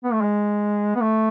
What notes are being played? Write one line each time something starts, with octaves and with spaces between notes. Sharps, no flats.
B3
A3
G#3
B3
A3